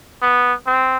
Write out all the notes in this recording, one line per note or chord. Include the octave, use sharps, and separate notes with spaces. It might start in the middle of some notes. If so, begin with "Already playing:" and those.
B3
C4